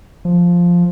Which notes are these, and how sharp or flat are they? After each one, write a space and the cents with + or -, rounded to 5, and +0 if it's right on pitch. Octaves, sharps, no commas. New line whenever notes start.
F3 +0